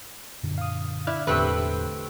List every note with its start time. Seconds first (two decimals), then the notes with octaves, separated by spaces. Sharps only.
0.43 F#2 A#2 D3
0.58 F5 D#6
1.07 E4 D5 F6 F#6
1.27 E1 E2 A2 D3 A3 C4 G4 B4